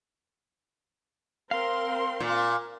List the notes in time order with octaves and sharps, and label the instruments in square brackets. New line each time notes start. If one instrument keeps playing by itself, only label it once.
[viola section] C4 A#4 C6 [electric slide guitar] F5
[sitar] A#2